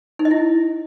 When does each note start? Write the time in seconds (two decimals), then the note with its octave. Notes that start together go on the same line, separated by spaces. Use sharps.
0.19 D#4
0.25 D#5
0.31 E4